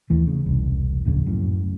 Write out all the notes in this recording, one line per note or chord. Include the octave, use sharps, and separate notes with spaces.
D#2 E3 A3
C#3
E1 C2
D1 A#1 C#3
F#2 A2